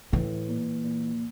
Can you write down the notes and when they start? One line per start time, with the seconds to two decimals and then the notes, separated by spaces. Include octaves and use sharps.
0.12 A2 E3
0.48 A#2
0.84 A#2